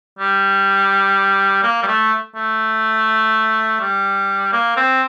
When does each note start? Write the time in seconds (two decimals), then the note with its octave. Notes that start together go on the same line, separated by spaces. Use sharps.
0.19 G3
1.63 A#3
1.82 G3
1.87 A3
2.35 A3
3.80 G3
4.52 A#3
4.76 C4